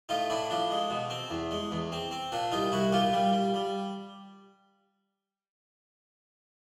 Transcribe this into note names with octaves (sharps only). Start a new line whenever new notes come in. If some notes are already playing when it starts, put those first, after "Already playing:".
A2 D#4 F4
A2 D4 E4
F3 D4
G#3
B2
C4
E2
G#3
E2
C4
C4
A#2 D4
C2 D#4 F4
C2 E4 F#4
A#2 F4 G4
G3
G3
G3